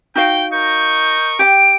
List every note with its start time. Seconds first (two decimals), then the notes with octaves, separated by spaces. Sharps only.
0.15 D#4 F#4 F5 G5
0.52 A#4 D#5 C#6 G6
1.39 G4 G5 D7